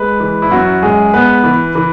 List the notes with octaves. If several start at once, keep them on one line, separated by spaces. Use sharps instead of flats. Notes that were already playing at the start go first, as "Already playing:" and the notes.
Already playing: G#3 B4
E3
E4
F#2 F#4
G#3 G#4
B3 B4
E3
E3